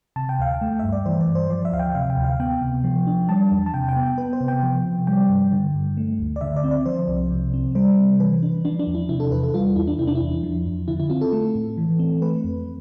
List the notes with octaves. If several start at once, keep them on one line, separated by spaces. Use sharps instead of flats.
C3 A5
G5
D2 F5
G5
A3
G2 E5
D5
E3 C5
D5
G2
C5
F3 D5
E5
D2 F5
G5
C3 F5
G5
D2
F5
B3 G5
C3
F3
D4
G3 A5
E2
A5
C3 G5
G5
B3
G5
B3 B4
C5
C3
G5
F3
C3
G3 G5
G2
D3
G2
A3
D2
D5
D3 E5
D5
C4
D5
F3 C5
C2
C3
C4
G3 C5
C3
E3 B4
D4
F3 D4
D4
E2
E4
C3 E4
A4
E2 B4
A4
G3 F4
E2 E4
D4
C3 E4
D4
E4
E2
F3
F2
D3 E4
E4
C4 F4
A4
A3
A2
E3
C4
A3 B4
F2